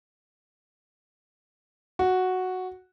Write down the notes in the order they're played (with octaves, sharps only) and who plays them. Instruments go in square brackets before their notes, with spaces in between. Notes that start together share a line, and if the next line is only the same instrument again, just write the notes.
[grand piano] F#4